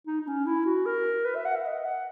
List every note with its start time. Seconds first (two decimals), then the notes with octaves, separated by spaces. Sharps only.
0.07 D#4
0.21 D#4
0.27 C#4
0.46 E4
0.66 F#4
0.86 A#4
1.25 B4
1.35 E5
1.45 F#5
1.56 E5
1.65 D#5
1.85 F#5